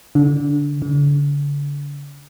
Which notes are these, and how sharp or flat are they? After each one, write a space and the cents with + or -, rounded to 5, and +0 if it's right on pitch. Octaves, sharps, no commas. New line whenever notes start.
D3 -20
D3 -40